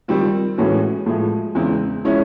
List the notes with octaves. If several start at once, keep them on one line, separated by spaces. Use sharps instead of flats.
D#3 G3 C4 F4
A2 E3 G#3 C#4 F#4
A2 F3 G#3
E2 C#3 E3 G#3 C4
F3 G#3 C#4 E4